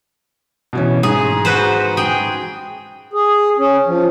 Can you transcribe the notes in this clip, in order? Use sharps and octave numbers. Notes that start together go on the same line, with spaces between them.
B2 E3 C#4
G#2 G#4
F#4 B4 C5
G#4 G5
G#4
C#4
F3